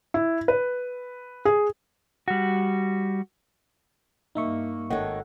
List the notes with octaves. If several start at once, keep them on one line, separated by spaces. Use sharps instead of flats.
E4
B4
G#4
G3 F#4
G2 A#3 D#4 E5 C#6
G#1 D#3 A4 C#5 F#5